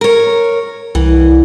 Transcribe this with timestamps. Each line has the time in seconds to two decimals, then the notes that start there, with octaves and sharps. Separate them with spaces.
0.01 A#4 C#5
0.95 C2 E3